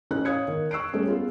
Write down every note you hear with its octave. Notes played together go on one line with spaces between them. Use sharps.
A1 C#4 F#6
C#5 F5 D#6 G#6 C#7
D#3
C#6 E6 F#6 C7 D7
G3 A3 C#4 G4 G#4
B3 F4 G#4